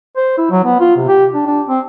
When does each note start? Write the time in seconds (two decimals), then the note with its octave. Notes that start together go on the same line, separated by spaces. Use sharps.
0.17 C5
0.38 E4
0.51 F#3
0.64 B3
0.80 F4
0.97 C3
1.08 G4
1.34 D4
1.47 D4
1.69 C4